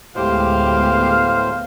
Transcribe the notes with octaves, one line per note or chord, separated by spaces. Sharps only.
D2 A2 G#3 B3 G4 C5 F5